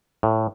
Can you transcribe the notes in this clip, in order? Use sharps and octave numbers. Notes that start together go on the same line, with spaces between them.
A2